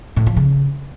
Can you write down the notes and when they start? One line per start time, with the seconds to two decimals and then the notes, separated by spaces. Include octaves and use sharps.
0.17 A2
0.27 F3
0.37 C#3